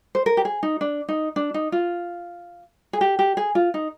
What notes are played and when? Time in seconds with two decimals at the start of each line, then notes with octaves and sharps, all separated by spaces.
0.15 C5
0.26 A#4
0.37 G4
0.45 G#4
0.63 D#4
0.81 D4
1.09 D#4
1.36 D4
1.54 D#4
1.72 F4
2.93 G#4
3.01 G4
3.19 G4
3.37 G#4
3.55 F4
3.74 D#4